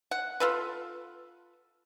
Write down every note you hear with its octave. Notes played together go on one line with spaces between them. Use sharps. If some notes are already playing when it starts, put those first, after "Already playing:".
F#5
F4 A4 B4